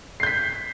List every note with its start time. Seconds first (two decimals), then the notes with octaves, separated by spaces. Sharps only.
0.20 C7
0.23 G6
0.26 B6